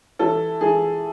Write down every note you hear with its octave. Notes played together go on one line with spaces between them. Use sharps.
E3 A4
E3 G#4